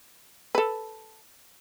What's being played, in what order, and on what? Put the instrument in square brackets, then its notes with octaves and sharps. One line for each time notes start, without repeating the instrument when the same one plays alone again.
[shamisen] A4 B4